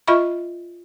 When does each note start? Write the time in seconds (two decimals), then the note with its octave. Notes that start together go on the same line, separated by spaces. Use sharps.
0.07 F4 D#5 E5 B5 C#6